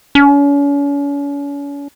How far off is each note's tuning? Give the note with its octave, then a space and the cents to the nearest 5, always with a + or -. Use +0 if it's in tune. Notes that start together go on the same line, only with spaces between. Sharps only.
C#4 +40